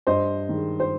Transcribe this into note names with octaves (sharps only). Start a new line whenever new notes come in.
G2 C5 D#5
D#3 G#3
C5